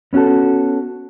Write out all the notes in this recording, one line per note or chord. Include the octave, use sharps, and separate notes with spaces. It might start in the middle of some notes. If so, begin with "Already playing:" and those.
B3 C#4 F4 F#4 A4